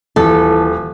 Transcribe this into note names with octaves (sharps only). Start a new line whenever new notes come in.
D#1 E3 A4